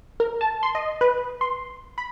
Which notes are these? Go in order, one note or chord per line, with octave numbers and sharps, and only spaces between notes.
A#4
A5
C6
D#5
B4
C6
B5